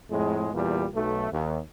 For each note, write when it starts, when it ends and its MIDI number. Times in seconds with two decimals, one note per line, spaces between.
0.11 0.49 41
0.11 0.49 45
0.11 0.49 56
0.54 0.86 40
0.54 0.86 46
0.54 0.86 55
0.94 1.30 35
0.94 1.30 57
1.32 1.59 39